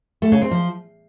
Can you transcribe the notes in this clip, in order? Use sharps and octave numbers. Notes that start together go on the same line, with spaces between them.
A3
C#3
C4
F3